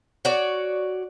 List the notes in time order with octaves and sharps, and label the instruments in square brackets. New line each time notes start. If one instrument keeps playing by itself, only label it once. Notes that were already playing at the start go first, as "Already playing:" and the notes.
[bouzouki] F#4 C#5 D5